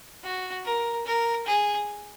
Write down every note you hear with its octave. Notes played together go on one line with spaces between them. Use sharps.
F#4
A#4
A#4
G#4